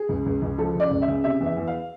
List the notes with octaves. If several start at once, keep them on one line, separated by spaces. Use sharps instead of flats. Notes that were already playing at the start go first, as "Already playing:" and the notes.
Already playing: G#4
C#2
C#2
C#2
F3 A4
C#3 D5
C#2
E5
C#3
C3 E5
E2
E5
E2
F5